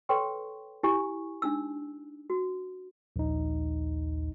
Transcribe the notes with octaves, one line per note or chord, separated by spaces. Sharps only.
A4 B4 C#5 G5 C6 C#6
E4 G4 G#5 B5 C#6
D4 D#4 E6
F#4
A#1 D#2 D#4